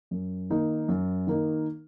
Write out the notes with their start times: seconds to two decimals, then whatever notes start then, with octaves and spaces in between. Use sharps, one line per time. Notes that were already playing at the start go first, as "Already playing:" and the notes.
0.11 F#2
0.50 D#3 A#3 D#4
0.88 F#2
1.27 D#3 A#3 D#4